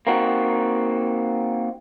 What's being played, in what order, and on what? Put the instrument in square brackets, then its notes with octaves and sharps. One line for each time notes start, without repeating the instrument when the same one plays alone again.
[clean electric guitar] A#3 C4 D#4 F#4